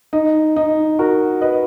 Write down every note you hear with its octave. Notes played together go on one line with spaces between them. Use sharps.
D#4
D#4
F#4 A#4
B4 D#5